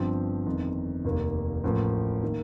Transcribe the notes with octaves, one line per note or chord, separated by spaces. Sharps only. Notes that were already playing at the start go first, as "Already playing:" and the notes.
Already playing: G1 G2 F3 C4
G1 F2 D#3
F1 D#2 D#3 A#3
A1 A2 F3 A#3
D#3 A#3